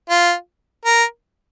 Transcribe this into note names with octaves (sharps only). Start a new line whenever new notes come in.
F4
A#4